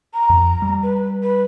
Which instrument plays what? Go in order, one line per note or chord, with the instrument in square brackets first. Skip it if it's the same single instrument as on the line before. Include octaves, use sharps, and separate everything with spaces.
[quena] A#5
[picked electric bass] F2
G3
[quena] B4
B4